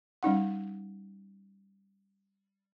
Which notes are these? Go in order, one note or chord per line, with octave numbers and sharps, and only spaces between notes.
G3 C#4 D#4 F#5